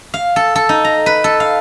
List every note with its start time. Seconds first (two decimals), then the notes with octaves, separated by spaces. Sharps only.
0.14 F5
0.36 A4
0.56 A4
0.69 D#4
0.85 A#5
1.06 B4
1.24 A4
1.40 F5